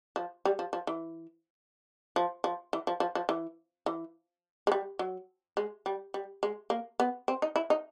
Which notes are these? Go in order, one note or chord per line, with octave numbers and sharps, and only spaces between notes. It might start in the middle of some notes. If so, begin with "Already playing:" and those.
F3
G3
F3
F3
E3
F3
F3
E3
F3
F3
F3
E3
E3
G#3
G3
F#3
G#3
G3
G3
G#3
A#3
B3
C4
D#4
E4
D#4